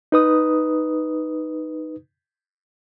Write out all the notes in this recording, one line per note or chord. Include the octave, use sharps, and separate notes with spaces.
D#4 B4 D#6